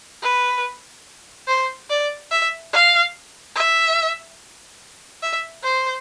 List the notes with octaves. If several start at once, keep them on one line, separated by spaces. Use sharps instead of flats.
B4
C5
D5
E5
F5
E5
E5
C5